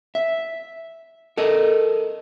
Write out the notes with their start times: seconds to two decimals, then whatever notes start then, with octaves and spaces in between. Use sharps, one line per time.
0.15 E5
1.37 A4 A#4 D#5